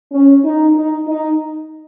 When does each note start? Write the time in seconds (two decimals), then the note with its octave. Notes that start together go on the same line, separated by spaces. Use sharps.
0.12 C#4
0.44 D#4
0.75 D#4
1.07 D#4